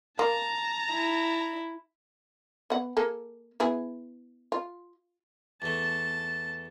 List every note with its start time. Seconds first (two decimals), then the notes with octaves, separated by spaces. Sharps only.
0.19 A#3 A5 A#5
0.92 E4
2.70 B3 F#5
2.97 A#3 G#4 A4
3.60 B3 E4 G#4
4.52 F4
5.62 E2 A3 A5